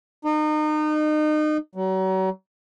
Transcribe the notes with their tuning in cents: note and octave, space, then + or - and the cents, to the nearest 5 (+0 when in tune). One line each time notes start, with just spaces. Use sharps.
D#4 -30
F#3 +35